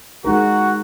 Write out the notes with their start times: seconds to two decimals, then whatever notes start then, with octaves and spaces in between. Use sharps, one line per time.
0.24 G#3 D#4 F#4 A#4